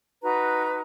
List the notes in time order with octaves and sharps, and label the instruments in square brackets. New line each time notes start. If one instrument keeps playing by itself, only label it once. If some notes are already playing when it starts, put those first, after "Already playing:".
[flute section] D#4 F#4 B4 A#5